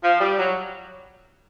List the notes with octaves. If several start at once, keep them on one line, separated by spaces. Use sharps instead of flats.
F3
G3
F#3